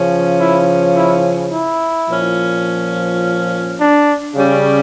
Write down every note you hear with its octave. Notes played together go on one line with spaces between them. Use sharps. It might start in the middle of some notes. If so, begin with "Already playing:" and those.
Already playing: C#3 F3 C#4
E4
E4
E4
A#2 F3 C#4
D4
C#3 G3 C#4